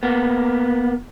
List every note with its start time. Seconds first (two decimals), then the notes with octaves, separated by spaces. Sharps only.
0.03 A#3 B3